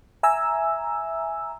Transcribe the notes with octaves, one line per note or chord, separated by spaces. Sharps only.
E5 G#5 A#5 E6